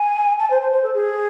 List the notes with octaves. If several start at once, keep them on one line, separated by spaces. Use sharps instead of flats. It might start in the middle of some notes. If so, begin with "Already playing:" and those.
Already playing: G#5
A5
C5
C5
C5
A4
G#4